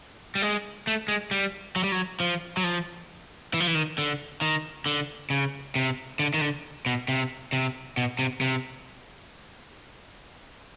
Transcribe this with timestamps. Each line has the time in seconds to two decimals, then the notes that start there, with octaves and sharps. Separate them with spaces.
0.35 G3
0.42 G#3
0.87 A3
1.08 G#3
1.31 G3
1.76 F#3
1.84 G3
1.92 F#3
2.20 F3
2.57 F#3
2.64 F3
3.54 E3
3.60 F3
3.67 E3
3.75 D#3
3.98 D3
4.41 D#3
4.86 D3
5.30 C#3
5.76 C3
6.19 D3
6.34 D#3
6.41 D3
6.86 B2
7.08 C3
7.53 C3
7.97 B2
8.19 C3
8.41 C3